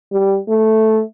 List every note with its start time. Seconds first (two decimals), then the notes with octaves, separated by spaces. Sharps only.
0.12 G3
0.49 A3